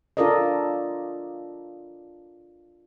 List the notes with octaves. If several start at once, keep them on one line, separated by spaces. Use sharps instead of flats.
D4 F4 A4 A#4 D5 D#5